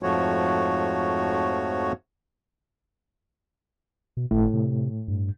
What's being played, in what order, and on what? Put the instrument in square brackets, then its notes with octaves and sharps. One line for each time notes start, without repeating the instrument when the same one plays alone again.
[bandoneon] F2 G#2 F3 A3 F#4 C#5
[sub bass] B2
[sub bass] G1 [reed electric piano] A2
[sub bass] C3
G2